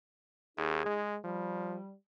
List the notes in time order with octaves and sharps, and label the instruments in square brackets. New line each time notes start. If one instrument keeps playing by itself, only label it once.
[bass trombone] D#2 [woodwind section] D#4 G#4
[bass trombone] G#3
[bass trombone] F3 [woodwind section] G3